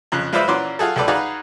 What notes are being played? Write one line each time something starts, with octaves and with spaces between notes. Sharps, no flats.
F2 C#3 F#6
G#3 F4 B4 C5 D5 E5
A#2 E3 C#4 F#4 C6 D6
F4 F#4 G#4 A4
C#2 G3 A4 B4 D5
D#4 F#4 G#4 B4 D5 F5